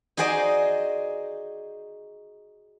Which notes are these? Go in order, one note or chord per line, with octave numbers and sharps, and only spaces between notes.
D#4 F#4 G#4 C5 D5 D#5